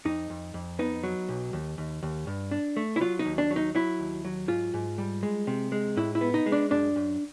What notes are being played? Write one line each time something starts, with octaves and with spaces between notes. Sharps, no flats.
F2 D#4
F2
F2
B3 D#4
F#3
B1
D#2
D#2
D#2
G2
D4
A3
E4
F#3 F4
D#4
D#2
D4
F#3
D#4
F#3 E4
D#2
F#3
G#2 F4
G#2
G3
G#3
C3
G#3
A2 E4
E4
B3
D#4
G#3
D4
F#2 D4
F#2